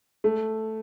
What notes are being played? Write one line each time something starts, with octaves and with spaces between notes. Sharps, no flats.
A3